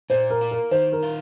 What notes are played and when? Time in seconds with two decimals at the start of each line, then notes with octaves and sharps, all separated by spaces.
0.10 A#2 C5
0.30 A#4
0.41 A#3
0.51 A#4
0.71 D#3 C5
0.92 A#4
1.03 F4